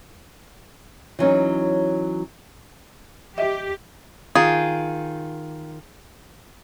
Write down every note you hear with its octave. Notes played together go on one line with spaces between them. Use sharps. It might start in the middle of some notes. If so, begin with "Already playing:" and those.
E3 F#3 C#4 D#4
G4 D#5 E5
D#3 F4 G#4